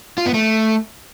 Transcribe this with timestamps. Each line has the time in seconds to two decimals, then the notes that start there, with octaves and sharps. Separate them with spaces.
0.18 F4
0.26 B3
0.34 A3